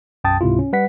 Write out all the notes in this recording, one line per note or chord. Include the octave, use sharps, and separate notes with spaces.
B1 F#2 G5 A5 D#6 A6
C#2 G#2 C3 E4 F4
C#4
G3 B4 F#5 B6